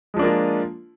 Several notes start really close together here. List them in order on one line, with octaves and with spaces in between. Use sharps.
G#3 F3 D4 A#3 F4